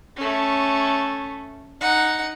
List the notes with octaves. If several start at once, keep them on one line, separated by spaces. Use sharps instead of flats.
A3 C#4
D#4 F#5